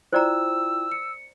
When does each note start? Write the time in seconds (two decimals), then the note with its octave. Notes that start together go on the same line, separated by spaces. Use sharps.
0.13 E4 F4 C5 D5 G5 A#5 E6
0.92 C#7